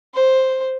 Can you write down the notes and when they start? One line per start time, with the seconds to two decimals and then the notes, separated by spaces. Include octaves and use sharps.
0.14 C5